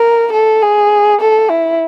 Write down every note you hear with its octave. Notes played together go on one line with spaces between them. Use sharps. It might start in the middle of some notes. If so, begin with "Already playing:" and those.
Already playing: A#4
A4
G#4
A4
E4